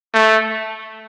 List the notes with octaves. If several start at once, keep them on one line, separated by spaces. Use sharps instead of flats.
A3